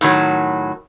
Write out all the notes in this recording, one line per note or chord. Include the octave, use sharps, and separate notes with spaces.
A2 D#3 F#3